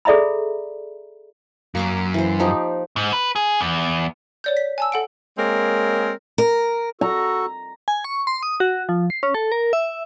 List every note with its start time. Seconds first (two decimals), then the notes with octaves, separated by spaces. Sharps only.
0.05 G#4 A4 D5 E5 A#5 B5
1.75 F#2 A#3 C#6 D6
2.14 E3 C5
2.40 F3 D#4 G4
2.96 G#2
3.13 B4
3.36 G#4
3.61 E2
4.44 C#5 D5 G6
4.57 B6
4.78 G#5 A5 E6
4.92 A4 F#5 D7
5.38 G#3 A#3 C4 A#4 C#5
6.38 A#4
7.01 F#4 A4 A#5
7.88 G#5
8.04 C#6
8.27 C6
8.43 D#6
8.60 F#4
8.89 F3
9.10 C7
9.23 C#4
9.35 A4
9.52 A#4
9.73 E5